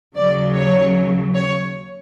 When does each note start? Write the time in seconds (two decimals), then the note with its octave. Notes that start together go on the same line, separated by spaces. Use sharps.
0.16 D#2 C#3 F#3 D5
0.55 C#5
1.35 C#5